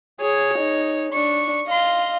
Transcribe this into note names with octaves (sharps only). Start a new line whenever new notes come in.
G#4 C#5
D#4
D4 C#6
D#5 F5 C6